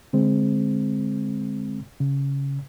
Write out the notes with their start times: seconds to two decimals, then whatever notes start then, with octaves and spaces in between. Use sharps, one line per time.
0.13 D3 G#3 C4
2.00 C#3